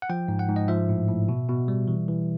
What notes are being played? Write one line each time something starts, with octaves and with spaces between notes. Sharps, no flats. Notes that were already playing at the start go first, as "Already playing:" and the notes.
F#5
F3 G5
G#2
F#5
G#2
D#5
F3 E5
A2
A2
B2
B2
G3
E3
E3